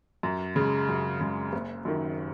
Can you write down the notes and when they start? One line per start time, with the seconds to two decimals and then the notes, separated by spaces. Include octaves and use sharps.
0.23 F#2
0.56 C#3 G#3
0.89 F#2
1.20 C#3 G#3
1.53 F#1
1.85 F#2 D#3